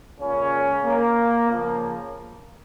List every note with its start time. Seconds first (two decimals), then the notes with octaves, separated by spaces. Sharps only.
0.20 A#2 C#3 G#3 C#4
0.85 A#3
1.49 C#3 F3 A#3